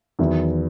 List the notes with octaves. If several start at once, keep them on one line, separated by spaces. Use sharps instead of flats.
E2 D#3 F#3 B3 E4